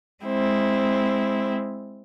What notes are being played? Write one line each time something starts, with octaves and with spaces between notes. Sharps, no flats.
G#3 C4 E4